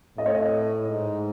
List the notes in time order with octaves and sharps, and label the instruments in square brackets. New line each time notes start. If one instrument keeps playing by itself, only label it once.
[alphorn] A2 [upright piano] D#5
[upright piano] C#5
D#5
[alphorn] G#2